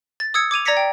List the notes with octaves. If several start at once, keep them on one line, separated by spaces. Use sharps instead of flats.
A6
D#6 E6 G#6 C#7
D6 G#6 D#7 F7
D5 A#5 G#6 A#6 B6 C#7
G5